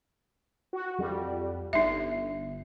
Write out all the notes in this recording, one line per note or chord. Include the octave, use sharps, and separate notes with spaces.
F#4
F2 G3
G1 D#4 E5